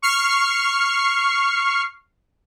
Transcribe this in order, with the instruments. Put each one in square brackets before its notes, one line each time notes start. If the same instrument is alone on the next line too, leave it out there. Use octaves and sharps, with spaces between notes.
[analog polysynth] C#6 F6 C7